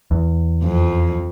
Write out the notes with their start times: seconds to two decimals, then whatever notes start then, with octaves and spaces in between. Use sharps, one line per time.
0.11 E2
0.64 F2